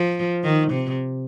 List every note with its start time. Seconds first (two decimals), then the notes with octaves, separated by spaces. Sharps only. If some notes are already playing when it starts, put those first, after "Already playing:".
Already playing: F3
0.44 D#3
0.71 C3